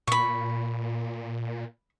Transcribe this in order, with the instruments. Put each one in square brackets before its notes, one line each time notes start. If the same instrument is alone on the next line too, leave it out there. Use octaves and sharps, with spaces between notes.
[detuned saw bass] A#2 [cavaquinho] B5 C#6